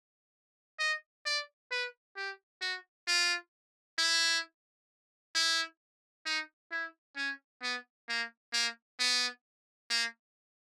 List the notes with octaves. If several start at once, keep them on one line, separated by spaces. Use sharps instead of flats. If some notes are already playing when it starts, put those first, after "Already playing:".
D#5
D5
B4
G4
F#4
F4
E4
E4
D#4
E4
C#4
B3
A#3
A#3
B3
A#3